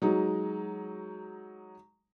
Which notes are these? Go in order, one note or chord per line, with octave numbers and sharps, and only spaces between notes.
F#3 G#3 D#4